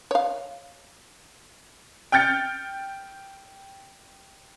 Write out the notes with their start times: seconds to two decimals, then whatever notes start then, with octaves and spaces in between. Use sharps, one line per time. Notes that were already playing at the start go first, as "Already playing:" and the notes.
0.11 C#5 F5
2.12 G5 F6 G6 A6 C#7